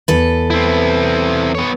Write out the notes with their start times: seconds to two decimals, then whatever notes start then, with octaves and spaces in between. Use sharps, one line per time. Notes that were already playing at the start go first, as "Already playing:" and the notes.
0.08 E2 A4 B4
0.50 C4 E4
1.55 B3 C#5